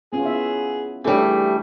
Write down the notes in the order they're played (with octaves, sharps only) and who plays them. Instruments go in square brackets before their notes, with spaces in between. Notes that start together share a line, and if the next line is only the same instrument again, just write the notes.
[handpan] B3 C#4 F4 [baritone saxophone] G#4
[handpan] B3 E4 E5
[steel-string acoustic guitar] E3 G3 [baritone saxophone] A3 [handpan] D4 G#4 A4